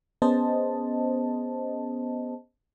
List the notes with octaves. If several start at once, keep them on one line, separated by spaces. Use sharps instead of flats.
B3 C#4 G#4 C5 D#5 A5